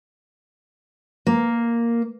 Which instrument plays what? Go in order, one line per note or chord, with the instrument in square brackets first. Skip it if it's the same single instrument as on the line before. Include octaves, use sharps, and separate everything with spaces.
[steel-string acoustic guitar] A#3